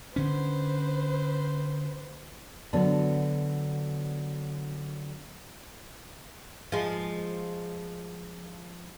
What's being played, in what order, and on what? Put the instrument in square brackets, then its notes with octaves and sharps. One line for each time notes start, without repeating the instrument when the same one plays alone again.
[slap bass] D3 C#4 [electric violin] B4 C5
[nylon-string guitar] D3 F#3 B3 D4
[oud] F3 G#3